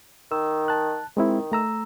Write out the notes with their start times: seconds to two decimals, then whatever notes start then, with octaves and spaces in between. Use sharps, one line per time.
0.32 D#3 E6
0.68 A5 F#6
1.17 D#3 G#3 C4 E4
1.52 A3 A#5 E6